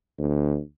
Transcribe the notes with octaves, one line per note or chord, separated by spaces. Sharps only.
D2